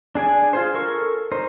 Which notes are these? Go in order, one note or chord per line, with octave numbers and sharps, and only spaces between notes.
D4 G#4 D5 G#5
F4 G#4 C5
A4 A#4 C#6
D#4 C5